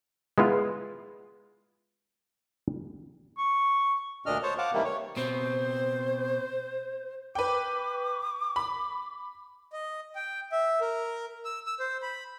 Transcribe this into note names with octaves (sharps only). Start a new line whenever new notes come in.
G#3 B3 E4 F4
C#6
D2 A#2 D4 D#5 F6
C5 C#5 A5
F5 F#5 A5 D6
C3 D#3 E3 G3 A3 A#3
C#5
B2 C4 C5
B4 G5 D6
B5
D#5
G5
E5
A#4
E6
E6
C5
B5